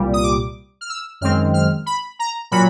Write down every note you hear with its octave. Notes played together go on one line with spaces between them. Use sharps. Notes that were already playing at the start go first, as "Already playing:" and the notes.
Already playing: C2 A#2 G3
D#6
D6
F6
E6
F#2 D#3 G#3 C4 F6
F6
B5
A#5
A#2 F#3 B5